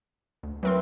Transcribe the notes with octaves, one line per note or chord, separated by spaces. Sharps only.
D2
E3 F#3 C4 A#4 C6